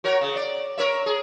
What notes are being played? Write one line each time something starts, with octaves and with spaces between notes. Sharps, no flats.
F#4 A#4 C#5
C#3
D5
A#4 C#5 E5
G#4